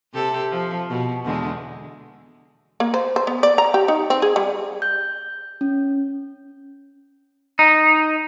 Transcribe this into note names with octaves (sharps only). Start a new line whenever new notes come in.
C3 G4 A4
F3
B2
E2 D3 G#3
A#3
C5
C5
B3
D5
A#5
G4
D#4
C4
G#4
G3
G6
C#4
D#4